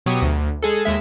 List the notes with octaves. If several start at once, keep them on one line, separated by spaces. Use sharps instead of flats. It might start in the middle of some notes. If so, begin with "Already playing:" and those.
B2 F#3 G4 C#6 D#6
D2
G#3 G#4 A4
D#2 G#3 E5